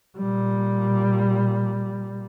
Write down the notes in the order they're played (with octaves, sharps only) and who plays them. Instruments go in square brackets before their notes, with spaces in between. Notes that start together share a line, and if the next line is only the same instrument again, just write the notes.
[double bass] A#2 G3